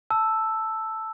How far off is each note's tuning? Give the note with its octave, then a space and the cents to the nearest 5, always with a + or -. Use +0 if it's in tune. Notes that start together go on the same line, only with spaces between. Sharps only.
A5 +0 E6 +0